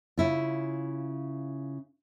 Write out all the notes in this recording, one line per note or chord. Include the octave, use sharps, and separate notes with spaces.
C#3 E4 F4